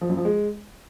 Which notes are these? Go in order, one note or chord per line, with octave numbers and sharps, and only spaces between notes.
F3
F#2
F3
G#3